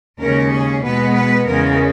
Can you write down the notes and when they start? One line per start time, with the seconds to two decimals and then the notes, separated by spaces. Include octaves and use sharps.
0.19 D#2 C#3 G#3 C#4 A#4
0.51 G#4
0.83 B2 G#3 B3 B4
1.14 B4
1.46 E2 C#3 G#3 A#4